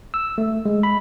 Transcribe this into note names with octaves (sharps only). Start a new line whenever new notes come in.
E6
A3
G#3
B5